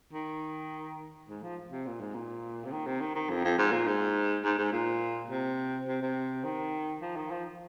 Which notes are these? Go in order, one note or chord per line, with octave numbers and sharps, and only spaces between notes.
D#3
G#2
F3
C3
A#2
G#2
A#2
C3
D#3
C3
D#3
D#3
F2
F2
G#2
A#2
G#2
G#2
G#2
A#2
C3
C3
C3
D#3
F3
D#3
F3